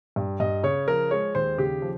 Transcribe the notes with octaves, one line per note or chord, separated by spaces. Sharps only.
G2
G2 D#5
C#3 C#5
F3 A#4
G#3 C#5
D#2 C5
C#3 G4
F3